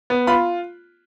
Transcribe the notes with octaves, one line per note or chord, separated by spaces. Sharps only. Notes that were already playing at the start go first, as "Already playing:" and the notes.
B3
F4 B5